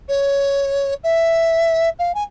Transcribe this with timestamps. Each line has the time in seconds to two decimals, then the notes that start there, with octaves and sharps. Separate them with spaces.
0.09 C#5
1.04 E5
1.99 F5
2.15 G#5